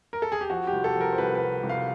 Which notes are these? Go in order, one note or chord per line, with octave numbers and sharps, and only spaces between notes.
A#4
A4
G#4
G4
F3 F#4
G4
C2
A4
F3 A#4
C5
C2 B4
B4
C2
C2
F5